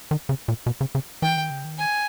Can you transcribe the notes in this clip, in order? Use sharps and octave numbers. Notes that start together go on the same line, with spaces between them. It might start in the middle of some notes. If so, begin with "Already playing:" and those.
D#3
C#3
A#2
B2
C#3
C#3
E3 G5
D#3
C#3
D#3
G#5